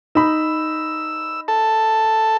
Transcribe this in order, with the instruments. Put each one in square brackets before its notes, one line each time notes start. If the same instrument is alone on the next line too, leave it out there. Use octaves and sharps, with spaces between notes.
[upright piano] D#4 B5 [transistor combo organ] E6
[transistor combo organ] A4 A5